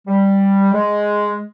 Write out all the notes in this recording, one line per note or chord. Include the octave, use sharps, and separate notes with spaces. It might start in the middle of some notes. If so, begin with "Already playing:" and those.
G3
G#3